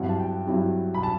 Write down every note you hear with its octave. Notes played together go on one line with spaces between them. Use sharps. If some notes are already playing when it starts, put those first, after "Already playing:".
Already playing: G2 F#3 C4 E4 F#5
A5
G5
G2 F#3 C4 E4
B5
A5